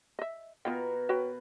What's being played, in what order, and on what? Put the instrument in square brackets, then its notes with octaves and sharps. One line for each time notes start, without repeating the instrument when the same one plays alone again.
[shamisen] D#5 E5
[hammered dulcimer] B2 A#4 [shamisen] B3 F4 G5
[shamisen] F#4 C#5 G5 [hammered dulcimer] B4